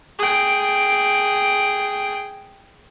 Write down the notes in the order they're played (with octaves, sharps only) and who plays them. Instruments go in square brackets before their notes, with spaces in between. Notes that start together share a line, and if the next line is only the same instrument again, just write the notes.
[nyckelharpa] G#4 G5